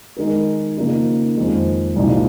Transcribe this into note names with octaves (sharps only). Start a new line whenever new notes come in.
D#3 G#3 D#4 A#4
C#3 F3 A#3 D#4 G#4
F2 D#3 G#3
C2 A#2 G#3 D#4